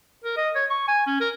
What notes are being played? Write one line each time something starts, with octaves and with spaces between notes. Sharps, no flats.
A#4
D#5
C#5
C#6
G#5
C#4
A#4